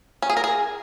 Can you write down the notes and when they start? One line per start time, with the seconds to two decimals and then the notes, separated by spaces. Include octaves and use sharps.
0.22 C#4
0.30 G#4
0.37 A#4
0.44 G#4